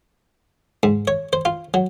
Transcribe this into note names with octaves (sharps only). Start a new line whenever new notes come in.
G#2
C#5
C5
F4
F#3